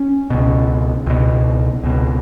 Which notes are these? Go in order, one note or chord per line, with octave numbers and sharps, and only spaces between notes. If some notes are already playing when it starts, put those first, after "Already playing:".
Already playing: C#4
C#2 B2
C#2 B2
C#2 B2